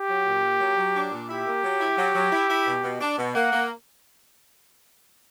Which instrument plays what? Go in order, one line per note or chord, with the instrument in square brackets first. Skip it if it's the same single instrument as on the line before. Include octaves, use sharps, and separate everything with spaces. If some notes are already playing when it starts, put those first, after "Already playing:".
Already playing: [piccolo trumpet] G4
[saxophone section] F#3
A#2
A#3
F#3
F#3
D4
A#2
[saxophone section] E4 [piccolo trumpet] G4
[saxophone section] A#3
F#3
E4
F#3
F#3
E4
E4
B2
B2
D4
B2
[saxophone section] A#3 [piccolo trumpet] F#5
[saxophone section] A#3